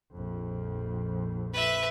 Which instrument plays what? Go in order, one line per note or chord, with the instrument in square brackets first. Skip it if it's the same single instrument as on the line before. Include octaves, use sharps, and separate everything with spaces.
[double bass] A#1 F2
[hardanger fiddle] B4 E5